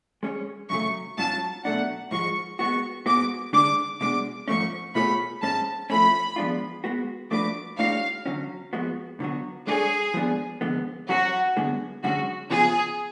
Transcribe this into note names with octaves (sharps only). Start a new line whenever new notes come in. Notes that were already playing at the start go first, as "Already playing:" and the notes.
G#3 C#4 G#4 C#5
F#2 C#3 F#3 A3 C#6
G#2 F#3 C#4 F4 A5
B2 F#3 A3 D4 F#5
G#2 F3 G#3 C#6
G#3 B3 F#4 C#6
G#2 G#3 B3 F#4 D6
D3 G#3 D4 D6
B2 G#3 D4 D6
G#2 F3 A3 C#4 C#6
B2 A3 F4 G#4 C#5 B5
G#2 G#3 C#4 A5
F3 A3 C#4 B5
F3 G#3 B3 D4 F4
G#3 B3 F#4
F3 A3 D4 F#4 B4 D6
A2 G#3 D4 F#4 C#5 F5
D3 F#3 C#4 F#4
F2 F3 G#3 B3 F#4
D3 F#3 B3 F#4
G#3 D4 F#4 G#4 A4 C#5
F3 G#3 B3 D4 G#4
F2 D3 G#3 B3
F#3 C#4 F#4 G#4 C#5
F#2 D3 G#3 B3
F#2 D3 G#3 C#4 F#4
C#3 F3 B3 F4 G#4